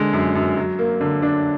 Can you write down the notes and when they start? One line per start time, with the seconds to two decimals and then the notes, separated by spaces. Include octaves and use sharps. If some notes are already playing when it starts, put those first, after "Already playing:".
Already playing: D3 G#3
0.13 F#2
0.35 F#2
0.57 F#3
0.79 A#3
1.01 D3
1.22 D4